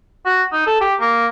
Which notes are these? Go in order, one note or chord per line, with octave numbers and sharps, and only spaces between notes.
F#4
D#4
A4
G4
A#3